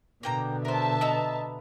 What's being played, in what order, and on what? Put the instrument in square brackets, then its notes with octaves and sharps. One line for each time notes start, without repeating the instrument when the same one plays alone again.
[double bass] B2 D3 [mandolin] A#3 G5 A#5
[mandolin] A#4 C5 [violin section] E5 A5
[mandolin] B3 A#5 E6 [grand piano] D#5